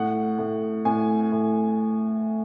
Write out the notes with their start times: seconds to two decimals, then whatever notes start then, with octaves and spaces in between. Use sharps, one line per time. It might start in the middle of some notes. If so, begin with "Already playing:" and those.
Already playing: A2 F#5
0.39 A2
0.85 A2 G#5
1.32 A2